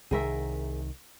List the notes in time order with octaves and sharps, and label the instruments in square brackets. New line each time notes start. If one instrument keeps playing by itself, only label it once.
[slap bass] C2 D#3 [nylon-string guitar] G#4 A#4 E5